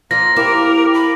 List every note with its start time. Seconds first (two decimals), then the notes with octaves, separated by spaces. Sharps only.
0.11 F3 A#3 A#6
0.36 A#3 E4 G4 A#4
0.94 B5